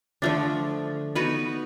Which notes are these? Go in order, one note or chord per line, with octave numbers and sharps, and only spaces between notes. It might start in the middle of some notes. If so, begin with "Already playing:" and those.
D3 F3 A3 D4
B3 D#4 F#4 B4